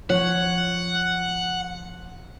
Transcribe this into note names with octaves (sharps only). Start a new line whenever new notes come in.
F3 C#5 F#5